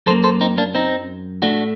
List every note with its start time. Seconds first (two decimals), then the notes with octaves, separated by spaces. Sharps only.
0.06 F#2 F#3 A#3 A4 C5
0.24 A4 C5
0.41 C4 D#4
0.58 A#3 D4
0.75 C4 D#4
1.42 A2 A3 D4 F#4